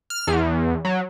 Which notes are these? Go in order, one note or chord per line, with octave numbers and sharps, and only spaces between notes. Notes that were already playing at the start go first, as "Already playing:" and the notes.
F6
E2
F#3